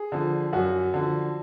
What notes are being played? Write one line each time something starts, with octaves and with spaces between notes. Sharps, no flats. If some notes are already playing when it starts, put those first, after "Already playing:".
Already playing: G#4
D3 F3
F#2 F#4
D3 F3